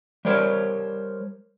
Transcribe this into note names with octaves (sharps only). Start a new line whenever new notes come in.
G3 A#4 C5 C#5